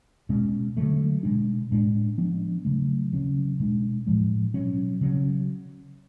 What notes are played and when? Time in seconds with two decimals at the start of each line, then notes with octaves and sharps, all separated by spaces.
0.29 B2 G#3 C#4
0.77 D3 F#3 A3
1.23 B2 G#3 D4
1.71 A2 G#3 B3 D4
2.18 F3 B3 D4
2.65 C#3 F#3 A3
3.13 C#3 F#3 C#4
3.60 B2 G#3 D4
4.07 A2 F3 G#3
4.54 B2 F#3 C#4
5.01 C#3 F#3 C#4